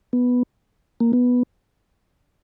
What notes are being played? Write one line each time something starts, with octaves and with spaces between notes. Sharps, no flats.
B3
A#3
B3